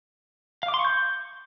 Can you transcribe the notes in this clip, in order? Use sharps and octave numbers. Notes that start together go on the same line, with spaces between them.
F5
D6
C6
C#6
G6